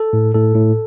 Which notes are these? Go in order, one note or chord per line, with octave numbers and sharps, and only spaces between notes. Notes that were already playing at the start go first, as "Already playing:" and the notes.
Already playing: A4
A2
A2 A4
A2